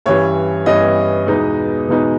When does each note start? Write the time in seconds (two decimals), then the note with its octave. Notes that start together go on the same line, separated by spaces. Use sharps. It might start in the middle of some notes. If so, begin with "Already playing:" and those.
0.06 G2 E3 G3 C#4 C#5
0.66 G2 E3 G3 C#4 D#5
1.27 E2 B2 G#3 B3 D#4
1.88 E2 B2 G#3 B3 D#4